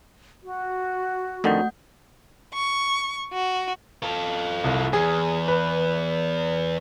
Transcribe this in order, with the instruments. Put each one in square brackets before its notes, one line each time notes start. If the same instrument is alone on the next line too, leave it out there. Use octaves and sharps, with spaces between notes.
[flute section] F#4
[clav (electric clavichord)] F2 D3 D#3 [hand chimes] A3 F#5 G6
[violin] C#6
F#4
[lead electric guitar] F4 A4
[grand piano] C2
[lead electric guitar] E2 [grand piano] G#4
[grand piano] B4